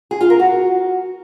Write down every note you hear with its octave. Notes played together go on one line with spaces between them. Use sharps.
G#4
F4
A#4
F#4